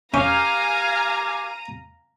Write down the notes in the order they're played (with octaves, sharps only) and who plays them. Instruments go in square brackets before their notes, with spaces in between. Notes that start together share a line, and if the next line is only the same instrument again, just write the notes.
[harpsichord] C#4 [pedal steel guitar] G4 A#4 [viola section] F5 G#5 [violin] A#5 D#7